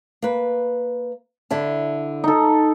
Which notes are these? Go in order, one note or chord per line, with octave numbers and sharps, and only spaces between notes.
A#3 B4
D3 E4 A5
D#4 A4